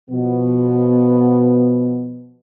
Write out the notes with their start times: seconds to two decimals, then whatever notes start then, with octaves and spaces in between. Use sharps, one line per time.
0.10 B2 F3 B3